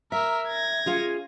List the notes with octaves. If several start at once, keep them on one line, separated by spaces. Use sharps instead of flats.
A#4 E5 E6
G#6 A#6
C#4 F4 G#4